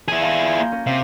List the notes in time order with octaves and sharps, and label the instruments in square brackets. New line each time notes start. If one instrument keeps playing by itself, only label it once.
[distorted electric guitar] E4 G#4 [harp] G#6
[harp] F5 A5 C6
F4 G#5
A#3 G6
C#4 A#4
[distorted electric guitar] C3 [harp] F5